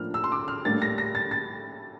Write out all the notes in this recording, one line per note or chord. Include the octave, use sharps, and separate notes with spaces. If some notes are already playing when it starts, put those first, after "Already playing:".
Already playing: A2 F3 A#3 D4 F6
E6
C6
D6
F6
A2 G3 A#3 D4 A6
A#6
A#6
A6
A6